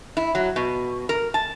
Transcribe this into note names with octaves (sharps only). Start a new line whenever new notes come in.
E4
F#3
B2
A#4
A5